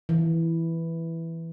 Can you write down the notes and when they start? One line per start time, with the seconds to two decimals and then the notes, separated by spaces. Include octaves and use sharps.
0.09 E3